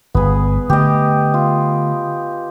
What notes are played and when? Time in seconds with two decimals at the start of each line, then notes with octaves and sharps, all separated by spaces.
0.15 G1 B3 G#4
0.70 D3 A3 G4 D#5
1.34 F4